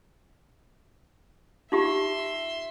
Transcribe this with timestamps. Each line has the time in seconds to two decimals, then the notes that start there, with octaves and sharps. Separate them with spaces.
1.72 D#4 F4 G4 E5 C6